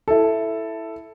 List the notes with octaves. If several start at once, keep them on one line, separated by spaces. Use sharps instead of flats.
E4 A4